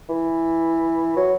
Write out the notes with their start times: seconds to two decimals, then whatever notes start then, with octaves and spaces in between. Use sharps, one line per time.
0.10 E3
1.16 F#3